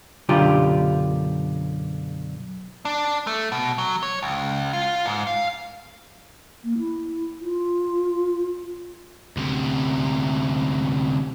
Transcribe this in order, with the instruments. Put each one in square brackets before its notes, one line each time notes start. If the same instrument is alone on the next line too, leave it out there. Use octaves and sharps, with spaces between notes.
[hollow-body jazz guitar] B1 F#2 D3 F4 G4
[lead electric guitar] D4
A3
B2
F#3
C#5
C#2
F4
G#2
F5
[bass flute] A#3
E4
F4
[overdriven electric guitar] D2 C3